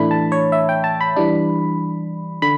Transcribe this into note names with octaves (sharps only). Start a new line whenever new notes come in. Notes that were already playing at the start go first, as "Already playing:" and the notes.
Already playing: A2 E3 A3 D4 B5
A5
C#5
E5
G5
A5
B5
E3 G3 D4
D3 B5